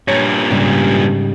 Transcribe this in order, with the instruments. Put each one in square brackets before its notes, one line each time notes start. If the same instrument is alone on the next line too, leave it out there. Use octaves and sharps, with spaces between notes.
[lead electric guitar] G2 A#2 [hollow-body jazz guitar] C#5
[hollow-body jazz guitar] G#2 C#3 G3